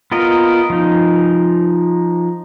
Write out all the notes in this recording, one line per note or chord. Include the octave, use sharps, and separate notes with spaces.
B3 F4 A#4 D#5
F3 D#4